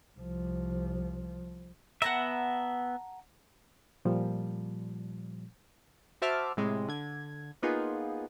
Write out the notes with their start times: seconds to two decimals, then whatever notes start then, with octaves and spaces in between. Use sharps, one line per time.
0.19 C2 F3
2.02 B3 E5 F#5 A5 A#5
4.05 A#2 F3 G3
6.22 F#4 C5 E5 A5 D6 F6
6.57 A2 C3 G#3
6.88 D3 G#6
7.62 A#3 B3 D#4 F4 G#4